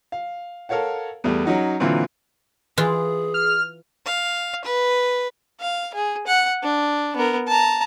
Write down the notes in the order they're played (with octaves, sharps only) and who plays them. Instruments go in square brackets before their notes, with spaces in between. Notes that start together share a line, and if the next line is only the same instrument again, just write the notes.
[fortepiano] F5
A4 A#4 C#5 F5 F#5
E2 G3 A3
F#3 C#4 D#4 F#5
A#2 D3 E3 F#3 C4 F4
[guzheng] E3 F4 [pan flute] G#4
[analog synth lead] F6
[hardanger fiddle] F5
B4
[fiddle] F5
G#4
F#5
D4
B3 A#4
A5 A#5